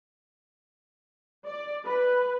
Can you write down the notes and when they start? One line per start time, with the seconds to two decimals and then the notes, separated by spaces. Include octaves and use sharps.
1.45 D5
1.86 B4